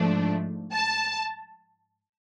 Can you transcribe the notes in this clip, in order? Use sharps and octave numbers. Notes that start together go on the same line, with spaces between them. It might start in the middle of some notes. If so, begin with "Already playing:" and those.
Already playing: G#2 F3 A3 D4
A5